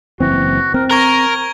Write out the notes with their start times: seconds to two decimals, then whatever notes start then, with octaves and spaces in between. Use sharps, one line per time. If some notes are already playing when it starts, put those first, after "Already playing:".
0.20 F#1 E3 C4 F#4
0.74 C4 A#4
0.91 A#4 A#5 C#6 G#6 G7